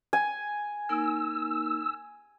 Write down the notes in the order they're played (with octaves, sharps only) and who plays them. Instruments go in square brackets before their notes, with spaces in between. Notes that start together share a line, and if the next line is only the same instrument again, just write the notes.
[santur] G#5
[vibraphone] A#3 D#4 A#4 [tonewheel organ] E6